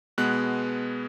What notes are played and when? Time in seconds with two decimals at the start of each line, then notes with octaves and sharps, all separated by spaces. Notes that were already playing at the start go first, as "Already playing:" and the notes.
0.18 B2 G#3 B3 F#6